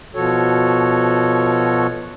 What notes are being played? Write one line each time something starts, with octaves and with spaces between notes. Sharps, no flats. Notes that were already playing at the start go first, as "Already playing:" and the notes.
B2 F3 F#4 A4 C#5